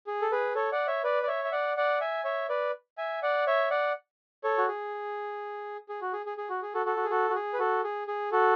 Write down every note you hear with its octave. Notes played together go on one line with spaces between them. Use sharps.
G#4
A4
G#4 B4
A4 C#5
D5 F#5
C#5 E5
B4 D5
D5
C#5 E5
E5
D5 F#5
D5 F#5
E5 G#5
C#5 E5
B4 D5
E5 G#5
D5 F#5
C#5 E5
D5 F#5
A4 C#5
F#4
G#4
G#4
F#4
G#4
G#4
G#4
F#4
G#4
F#4 A4
F#4 A4
F#4
G#4
F#4 A4
F#4
G#4
B4
F#4 A4
G#4
G#4
F#4 A4